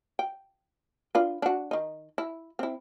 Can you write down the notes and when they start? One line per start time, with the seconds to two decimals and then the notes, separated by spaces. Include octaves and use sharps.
0.19 G5
1.15 D4 F4 B4
1.42 D4 F#4
1.71 D#3 D#4
2.18 E4
2.59 C4 E4